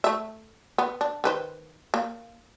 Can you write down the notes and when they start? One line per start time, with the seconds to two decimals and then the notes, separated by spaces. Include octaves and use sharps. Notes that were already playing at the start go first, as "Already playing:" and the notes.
0.04 A3 E5
0.78 B3
1.01 D4
1.24 D#3 B4 C5
1.94 A#3